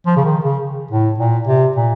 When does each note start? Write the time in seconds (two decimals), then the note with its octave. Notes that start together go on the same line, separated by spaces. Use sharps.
0.06 F3
0.16 C#3
0.25 D#3
0.44 C#3
0.91 A2
1.20 A#2
1.47 C3
1.76 A#2